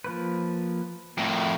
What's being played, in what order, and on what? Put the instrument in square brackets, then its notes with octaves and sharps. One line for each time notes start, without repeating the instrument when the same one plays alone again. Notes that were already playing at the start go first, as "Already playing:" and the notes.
[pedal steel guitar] F3 A#3 B4
[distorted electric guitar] F2 A2 [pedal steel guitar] A3 E4 A#4